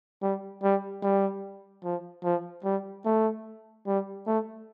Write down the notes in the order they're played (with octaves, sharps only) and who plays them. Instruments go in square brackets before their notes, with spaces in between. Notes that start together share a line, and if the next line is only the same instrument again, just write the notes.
[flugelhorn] G3
G3
G3
F3
F3
G3
A3
G3
A3